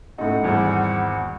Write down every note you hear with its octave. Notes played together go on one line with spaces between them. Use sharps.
A2 C#4 D#4 F#4 A4 F#5
G#1 E2 G3